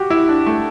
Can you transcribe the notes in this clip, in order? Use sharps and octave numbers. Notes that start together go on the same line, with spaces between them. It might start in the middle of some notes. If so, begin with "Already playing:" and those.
Already playing: F#4 G4
E4
D4
A3